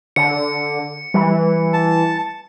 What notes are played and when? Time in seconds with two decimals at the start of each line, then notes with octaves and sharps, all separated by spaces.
0.16 D3 C#7
1.14 E3 G3
1.73 A5